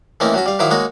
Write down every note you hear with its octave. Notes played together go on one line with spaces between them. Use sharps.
E3 A3 A#3 C4 C#4 D#4
F#3 C#4 F#4
G3 F5
D#3 F3 F#3 E4 F5 D6
G#3 A#3 D#4 F#4 C#5